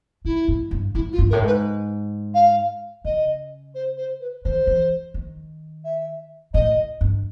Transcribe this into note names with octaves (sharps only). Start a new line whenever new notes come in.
G#2 E4
G#2
G2
G#2 E4
F4
G2
A2 A#4
G#2 B4
F5
C#3 D#5
C5
C5
B4
D#3 C5
E3
D#3
E5
A2 D#5
G2